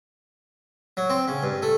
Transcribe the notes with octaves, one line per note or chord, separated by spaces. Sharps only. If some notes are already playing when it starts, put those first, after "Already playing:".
F#3
C4
C#3
G2
A3